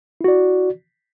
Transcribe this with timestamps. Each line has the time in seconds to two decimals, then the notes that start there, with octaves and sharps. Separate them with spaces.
0.21 E4
0.24 F#4
0.28 D5